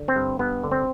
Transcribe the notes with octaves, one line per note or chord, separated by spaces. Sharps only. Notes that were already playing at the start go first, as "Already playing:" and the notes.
Already playing: D3
C4
G2
G2 B3
D3
C4